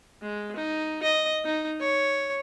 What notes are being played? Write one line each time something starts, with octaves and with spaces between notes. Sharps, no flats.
G#3
D#4
D#5
D#4
C#5